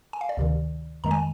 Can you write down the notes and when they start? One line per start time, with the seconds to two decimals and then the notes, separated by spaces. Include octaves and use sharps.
0.13 G#5
0.21 F5
0.29 D5
0.37 D2 C3 D#3
1.04 F2 D#3 G#3 A#5
1.11 G#5